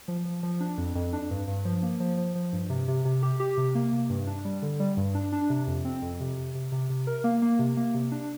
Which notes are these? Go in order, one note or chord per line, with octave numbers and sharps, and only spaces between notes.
F3
F3
F3
D4
F2
F2
D4
G2
G2
F3
A#3
F3
F3
F3
G2
C3
C3
C3
G4
G4
C3
A#3
C3
G2
D4
G3
D3
G3
G2
D4
D4
C3
F2
C4
F2
C3
C3
C3
C3
C3
A#4
A#3
A#3
C3
A#3
C3
D4